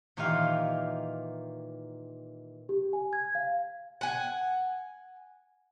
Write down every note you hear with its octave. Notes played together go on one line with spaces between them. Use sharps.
A#2 D#3 E3 D#4 G4 F5
G4
G#5
G#6
F5
F#5 G#5